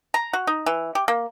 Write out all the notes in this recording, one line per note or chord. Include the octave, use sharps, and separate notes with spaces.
A#5
F#4
D#4
E3
G4
A#3